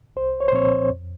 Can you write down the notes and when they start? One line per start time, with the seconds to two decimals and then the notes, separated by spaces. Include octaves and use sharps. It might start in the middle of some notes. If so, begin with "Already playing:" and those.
0.16 C2 C5
0.40 C#5
0.48 C5
0.52 A#2 F3 C4 C#5
0.90 F2